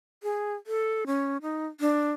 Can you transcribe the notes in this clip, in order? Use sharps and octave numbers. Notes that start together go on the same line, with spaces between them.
G#4
A4
C#4
D#4
D4